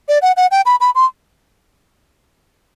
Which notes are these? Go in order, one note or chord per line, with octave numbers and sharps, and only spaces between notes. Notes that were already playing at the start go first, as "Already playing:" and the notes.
D5
F#5
F#5
G5
B5
B5
C6